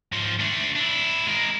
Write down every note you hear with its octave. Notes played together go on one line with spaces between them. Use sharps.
G#2 F3
A3 D4
D4 E4
G#3 A#4